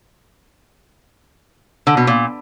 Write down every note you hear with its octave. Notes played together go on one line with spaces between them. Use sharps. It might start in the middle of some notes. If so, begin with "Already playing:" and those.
D3
B2
A#2